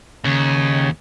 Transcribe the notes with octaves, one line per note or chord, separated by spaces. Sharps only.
D#2 C#3